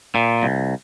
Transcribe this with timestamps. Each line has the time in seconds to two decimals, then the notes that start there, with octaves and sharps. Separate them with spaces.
0.15 A#2
0.43 C2